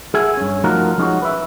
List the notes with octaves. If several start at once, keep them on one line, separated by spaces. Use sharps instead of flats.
G#4 A4 E5 F#5 G#5
G2 C#4
F3 A3 D#4 F4 F#4 A#4
F3 G#3 C#4 D#4 F4 F#4
B4 E5